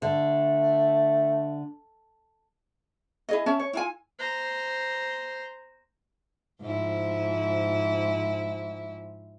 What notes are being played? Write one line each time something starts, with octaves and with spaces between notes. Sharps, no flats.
D3 A3
E4 G#4 D#5
C#4 C#5 E5 A5
C#5
E4 F4 G#5
C5 A#5
G#2 F3 E4